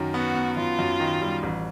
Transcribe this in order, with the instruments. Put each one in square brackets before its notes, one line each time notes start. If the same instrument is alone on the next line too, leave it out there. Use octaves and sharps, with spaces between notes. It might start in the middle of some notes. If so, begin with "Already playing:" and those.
Already playing: [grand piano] F#2 D#3
[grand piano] B3 [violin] F#4
[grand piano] B3
[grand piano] F#2 [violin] F4
[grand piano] F#2
D#3
G3
A1